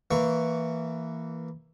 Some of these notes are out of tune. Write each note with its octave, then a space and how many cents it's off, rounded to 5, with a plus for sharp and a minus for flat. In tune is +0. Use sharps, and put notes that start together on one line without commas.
E3 +0 A#3 -10 C#6 +0